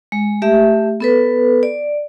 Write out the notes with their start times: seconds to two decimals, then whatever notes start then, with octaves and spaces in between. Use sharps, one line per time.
0.12 G#3
0.42 A3 G4 E5
1.00 B3 A4 B4
1.63 D5